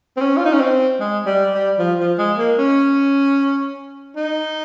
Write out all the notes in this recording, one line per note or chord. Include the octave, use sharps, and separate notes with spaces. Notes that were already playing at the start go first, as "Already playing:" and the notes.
C4
C#4
F4
D#4
C#4
C4
G#3
G3
G3
F3
F3
G#3
A#3
C#4
D#4